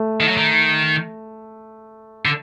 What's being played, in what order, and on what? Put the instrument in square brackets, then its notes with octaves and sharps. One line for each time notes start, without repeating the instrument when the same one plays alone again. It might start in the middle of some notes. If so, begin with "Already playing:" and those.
Already playing: [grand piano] A3
[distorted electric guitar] D#3
F#3
D#3
D3